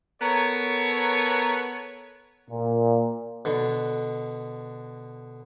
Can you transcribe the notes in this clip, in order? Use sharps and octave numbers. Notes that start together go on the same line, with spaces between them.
B3 A4 A#4 C#5
A#2
B2 D3